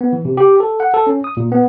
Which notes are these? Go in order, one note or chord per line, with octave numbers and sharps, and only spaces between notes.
B3
E3
C3
G4
A4
F#5
A4
C#4
D#6
A#2
B3